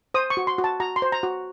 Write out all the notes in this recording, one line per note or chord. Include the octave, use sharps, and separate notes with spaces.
C5 D#6
C#6
F#4
C6
F#4
A5
F#4 A#5
C6
C5
A#5
F#4